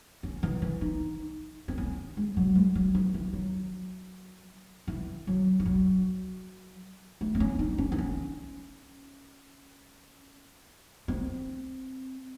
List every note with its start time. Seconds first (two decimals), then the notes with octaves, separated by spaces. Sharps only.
0.23 C#4
0.43 E3
0.62 E3
0.81 D#4
1.68 C4
1.78 C#4
2.17 G#3
2.37 F#3
2.55 G#3
2.75 F#3
2.95 E3
3.14 E3
3.33 F#3
4.88 E3
5.27 F#3
5.60 E3
5.66 F#3
7.21 A3
7.35 C4
7.40 C#4
7.59 D#4
7.78 C#4
7.92 D#4
7.98 C#4
11.08 C4